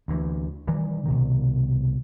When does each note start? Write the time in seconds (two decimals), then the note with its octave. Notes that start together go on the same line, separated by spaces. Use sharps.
0.08 D2 E3
0.67 D#3 E3 G3
1.06 C2 B2 D#3